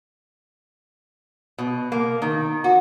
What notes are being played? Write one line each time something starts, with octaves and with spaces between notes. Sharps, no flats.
B2
A#3
D#3
F#4